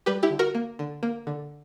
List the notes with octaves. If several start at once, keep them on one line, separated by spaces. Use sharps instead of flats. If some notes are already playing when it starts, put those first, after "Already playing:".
G3 G4 B4
E4 G4
D3
F#4 A#4
A#3
D3
A#3
D3